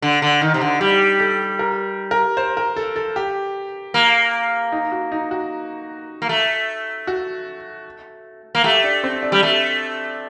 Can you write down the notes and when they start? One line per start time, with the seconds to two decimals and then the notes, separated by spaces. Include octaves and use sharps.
0.02 D3
0.22 D3
0.41 D#3 D#4
0.54 C3
0.61 D3
0.81 G3 G4
1.20 A4
1.59 A#4
2.11 A#4
2.37 C5
2.57 A#4
2.76 A4
2.96 A4
3.16 G4
3.94 A#3
4.72 D#4
4.92 F#4
5.12 D#4
5.31 F#4
6.22 A#3
6.29 A3
7.07 F#4
8.55 A#3
8.64 A3 G4
8.84 D4
9.04 C4
9.22 D4
9.32 G3
9.43 A3